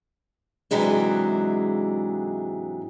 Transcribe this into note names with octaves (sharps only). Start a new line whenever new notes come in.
G#2 C3 E3 F#3 G#3 D4